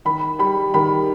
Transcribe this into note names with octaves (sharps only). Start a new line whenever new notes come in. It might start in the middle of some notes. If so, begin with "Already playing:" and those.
D#3 B5
G3 B5
D#3 B5